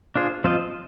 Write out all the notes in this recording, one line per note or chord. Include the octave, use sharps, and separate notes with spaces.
D4 F4 G#4 C5
F3 C4 F4 C5 D#5